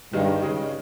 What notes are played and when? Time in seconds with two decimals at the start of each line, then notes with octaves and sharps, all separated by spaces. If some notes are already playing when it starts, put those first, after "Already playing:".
0.13 G2 D#3 G#3 D#4
0.42 C#3 G#3 C#4